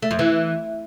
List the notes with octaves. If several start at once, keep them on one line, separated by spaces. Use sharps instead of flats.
A3
F2
E3